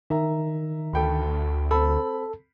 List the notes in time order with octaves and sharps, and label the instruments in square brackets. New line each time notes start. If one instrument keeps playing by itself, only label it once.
[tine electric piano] D#3 [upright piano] E5 A#5
[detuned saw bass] D2 [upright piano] A4 G5 B5
[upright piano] C4 B5 [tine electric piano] A4